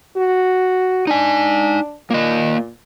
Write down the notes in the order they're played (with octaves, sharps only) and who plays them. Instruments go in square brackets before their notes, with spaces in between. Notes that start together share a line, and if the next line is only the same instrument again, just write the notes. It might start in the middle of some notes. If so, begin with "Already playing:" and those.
[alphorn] F#4
[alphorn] D4 [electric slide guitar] D#4 G#5
[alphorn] A#2 [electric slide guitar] A#3 D#5